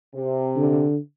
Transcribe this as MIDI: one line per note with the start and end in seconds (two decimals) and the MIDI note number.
0.15 0.84 48
0.56 0.97 50